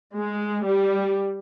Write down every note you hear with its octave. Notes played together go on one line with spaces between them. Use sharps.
G#3
G3